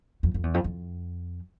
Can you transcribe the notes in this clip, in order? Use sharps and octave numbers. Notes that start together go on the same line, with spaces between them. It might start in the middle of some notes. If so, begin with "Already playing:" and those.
F2
F2
E2
F2
F2